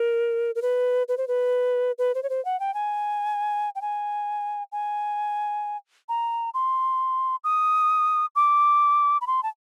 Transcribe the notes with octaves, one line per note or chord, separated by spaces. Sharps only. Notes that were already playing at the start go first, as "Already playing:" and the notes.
Already playing: A#4
A#4
B4
B4
C5
B4
B4
C5
C#5
C5
F#5
G5
G#5
G5
G#5
G#5
A#5
C6
D#6
D6
B5
C6
A5